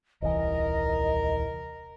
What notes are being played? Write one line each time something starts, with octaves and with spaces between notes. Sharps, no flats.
D#1 C2 E3 A#4 D#5